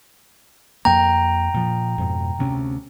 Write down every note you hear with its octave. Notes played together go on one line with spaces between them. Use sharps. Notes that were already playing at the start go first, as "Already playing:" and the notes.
F2 A#3 G5 A#5
A#2 F3
F2 G#2 B2
D2 C3 C#4